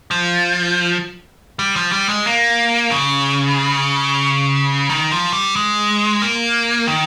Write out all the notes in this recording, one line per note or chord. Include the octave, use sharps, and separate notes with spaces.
F3
G3
F3
G3
G#3
A#3
C#3
D#3
F3
G3
G#3
A#3
D#3